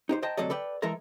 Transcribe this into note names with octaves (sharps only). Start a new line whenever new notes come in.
D#4 G4 C5
C5 D#5 G5 A5 A#5
D2 C3 F#3 A4 D5 D#5
A4 B4 D5 G5
E3 G#3 A4 A#4 E5 A#5